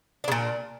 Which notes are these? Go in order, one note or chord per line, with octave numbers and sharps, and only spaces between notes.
A#2 C#3 D4